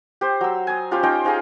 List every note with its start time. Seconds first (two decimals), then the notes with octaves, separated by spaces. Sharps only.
0.21 G4 C5
0.41 F#3 E6
0.67 G#5 D#6
0.91 C#4 F4 G4 C5
1.03 C#4 D#4 C5 G5
1.25 C#4 D#4 F4 G#4